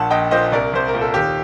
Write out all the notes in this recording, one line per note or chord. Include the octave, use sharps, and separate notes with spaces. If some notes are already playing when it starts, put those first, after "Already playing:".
Already playing: A#1 A#2 F#5 A5
A#1 D#5 G5
A#2 C5 D#5
C2 A#4 D5
C2 C5
A#4
A#2
A4
D#2 G4